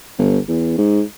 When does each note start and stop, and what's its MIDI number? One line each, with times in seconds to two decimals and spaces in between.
0.19 0.39 31
0.48 0.74 40
0.78 1.02 44